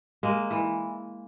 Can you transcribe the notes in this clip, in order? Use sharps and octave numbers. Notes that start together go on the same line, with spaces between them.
G#3 A#3
E3